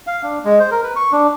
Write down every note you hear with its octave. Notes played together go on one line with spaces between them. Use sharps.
F5
D4
G#3
C5
A#4
B4
C#6
D4